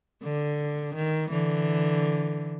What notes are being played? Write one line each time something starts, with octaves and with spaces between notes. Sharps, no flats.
D3
D#3
D3 E3